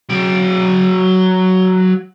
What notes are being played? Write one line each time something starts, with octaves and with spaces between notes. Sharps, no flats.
F#3 G5